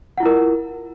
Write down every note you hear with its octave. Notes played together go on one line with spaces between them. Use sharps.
E4 F4 A#4 F#5